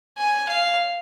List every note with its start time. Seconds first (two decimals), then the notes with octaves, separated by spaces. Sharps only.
0.18 G#5
0.48 F5